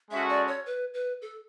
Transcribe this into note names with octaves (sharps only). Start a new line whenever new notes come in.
G#3 C#4 F#4 A4 E5
D5
C#5
B4
B4
A4